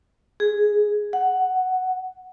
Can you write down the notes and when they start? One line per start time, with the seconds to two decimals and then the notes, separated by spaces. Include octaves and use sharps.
0.40 G#4
1.13 F#5